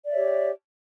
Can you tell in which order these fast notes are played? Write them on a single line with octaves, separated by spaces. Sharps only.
D5 E5 C#5 G4